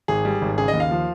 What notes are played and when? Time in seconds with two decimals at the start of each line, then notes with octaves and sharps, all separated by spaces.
0.08 G#1 G#4
0.25 G3
0.42 G#1
0.58 C#3 G#4
0.68 D#5
0.74 D#2
0.80 F5
0.91 F3